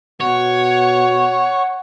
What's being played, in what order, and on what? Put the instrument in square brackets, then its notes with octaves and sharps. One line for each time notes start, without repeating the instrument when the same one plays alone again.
[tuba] B2 [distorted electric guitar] C#5 [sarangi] F#5